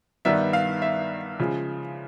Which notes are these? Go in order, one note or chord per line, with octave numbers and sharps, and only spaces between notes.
G2 D#3 G3 B3 E5
F5
E5
C#3 F3 G#3